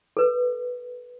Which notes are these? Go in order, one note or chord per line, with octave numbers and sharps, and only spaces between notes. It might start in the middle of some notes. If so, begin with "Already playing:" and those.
A4 B4